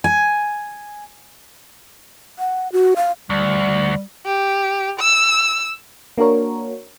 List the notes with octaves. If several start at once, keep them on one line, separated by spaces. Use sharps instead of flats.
G#5
F#5
F#4
F5
D2 G3
G4
E6
A#3 D4 F#4 A#4 C#5